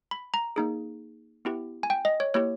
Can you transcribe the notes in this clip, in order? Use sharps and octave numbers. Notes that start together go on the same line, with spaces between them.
B5
A#5
A#3 D#4 G#4
B3 E4 G4
G#5
G5
D#5
C#5
A#3 E4 G4 C#5